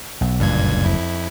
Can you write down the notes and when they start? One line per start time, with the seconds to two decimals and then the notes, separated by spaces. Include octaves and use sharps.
0.21 B1
0.40 F#1 D2 G2 A#2 G#6
0.85 F2 E4